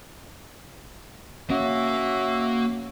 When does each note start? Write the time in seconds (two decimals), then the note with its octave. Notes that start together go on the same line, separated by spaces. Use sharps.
1.50 A#3 C#4 F#4 E5 F5